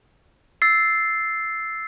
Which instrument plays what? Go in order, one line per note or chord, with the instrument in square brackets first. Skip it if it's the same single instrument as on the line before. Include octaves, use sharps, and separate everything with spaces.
[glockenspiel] E6 A6 C7